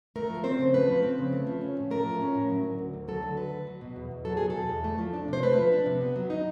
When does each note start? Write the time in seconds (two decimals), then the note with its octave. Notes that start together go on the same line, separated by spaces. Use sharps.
0.16 A3 A#4
0.30 F3
0.44 C4 C5
0.59 C#3
0.74 A3 B4
0.88 F3
1.03 C4
1.18 C#3
1.32 A3
1.47 F3
1.61 C#4
1.77 A2
1.91 A3 A#4
2.06 F3
2.21 C#4
2.35 A2
2.50 F#3
2.64 D3
2.79 D2
2.93 D2
3.08 F#3 A4
3.23 D3
3.37 D2 B4
3.52 D2
3.67 F#3
3.81 B2
3.96 E2
4.11 E2
4.25 F#3 A4
4.37 B2 G#4
4.50 A4
4.55 E2
4.69 E2
4.84 A3
4.98 F3
5.13 D4
5.28 C3 C5
5.43 A3 B4
5.58 F3
5.72 D4
5.86 C3
6.01 B3
6.16 F#3
6.30 D#4